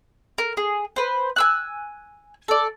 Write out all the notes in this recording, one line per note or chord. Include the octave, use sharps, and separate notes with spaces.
A#4
G#4
B4 C5
G#5 E6 F#6
A4 D5